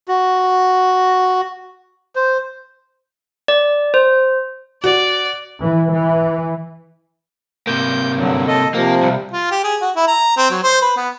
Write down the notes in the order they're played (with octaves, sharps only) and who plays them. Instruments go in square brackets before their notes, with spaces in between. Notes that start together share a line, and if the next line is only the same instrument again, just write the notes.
[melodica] F#4
C5
[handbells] D5
C5
[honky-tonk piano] F#4 [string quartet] D5
[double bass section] E3
E3
[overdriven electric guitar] C3 A#3 [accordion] G6
[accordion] G2 D3 F#3
A4 D#5
[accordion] C3 F3 [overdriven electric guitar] A#3
[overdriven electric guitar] C2
[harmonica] F4
G4
G#4
F#4
E4
A#5
C4
F#3
C5
B4
B3